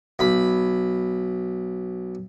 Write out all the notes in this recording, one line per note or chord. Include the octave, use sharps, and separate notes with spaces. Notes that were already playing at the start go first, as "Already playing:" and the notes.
B1 B5